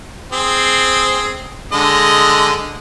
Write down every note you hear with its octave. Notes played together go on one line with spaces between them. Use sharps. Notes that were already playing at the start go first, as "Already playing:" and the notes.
C4 G#4
D3 G#3 D#5